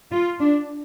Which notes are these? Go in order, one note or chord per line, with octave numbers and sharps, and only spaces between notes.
F4
D4